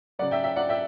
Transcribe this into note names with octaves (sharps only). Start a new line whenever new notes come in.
C#3 F#3 D5 F#5
E5 G5
E5 G5
D5 F#5
E5 G5